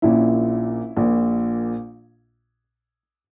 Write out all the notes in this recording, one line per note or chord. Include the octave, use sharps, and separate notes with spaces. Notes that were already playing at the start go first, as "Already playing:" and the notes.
A#1 A#2 C#4 E4
A#1 A#2